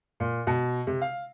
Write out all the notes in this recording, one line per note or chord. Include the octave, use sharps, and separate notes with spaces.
A#2
B2
C3
F5